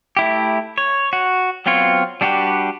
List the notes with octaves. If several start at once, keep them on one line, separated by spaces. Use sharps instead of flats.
A3 E4 G4
C#5
F#4
F#3 B3 C4 F4 C#5
G3 D4 F#4 G4 B4